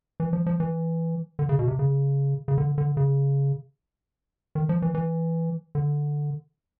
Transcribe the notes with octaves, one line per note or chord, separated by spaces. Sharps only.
E3
F3
F3
E3
D3
C#3
B2
C3
C#3
C#3
D3
D3
C#3
D#3
F3
E3
E3
D3